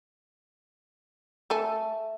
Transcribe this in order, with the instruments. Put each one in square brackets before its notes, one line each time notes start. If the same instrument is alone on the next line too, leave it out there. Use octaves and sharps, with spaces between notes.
[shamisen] A3 A4 G#5 [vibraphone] E5